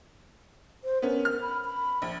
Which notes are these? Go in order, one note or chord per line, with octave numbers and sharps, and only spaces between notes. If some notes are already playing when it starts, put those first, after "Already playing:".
C5
B3 C#4 A#4
F6
B5
B5
A#1